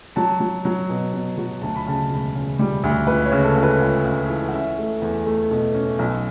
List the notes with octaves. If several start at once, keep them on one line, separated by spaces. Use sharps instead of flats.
F#3 A5
F#3
F#3
B2
B2
F#3
D2 A5
B5
C#3 A5
E1
C#3
G3
D2
C#2 B4
C#5
C#3
A4
C#2
B4
C#2
C#2
E3
F#5
C#4 E5
A3
E2
A3
B2
C#4
B1